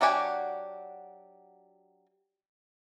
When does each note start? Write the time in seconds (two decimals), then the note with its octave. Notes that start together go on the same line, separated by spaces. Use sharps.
0.01 F#3 D4 F#4 G4 G#5